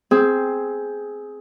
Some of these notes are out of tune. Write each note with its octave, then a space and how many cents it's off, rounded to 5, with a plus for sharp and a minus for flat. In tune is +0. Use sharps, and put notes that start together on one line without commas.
C4 +0 G#4 +10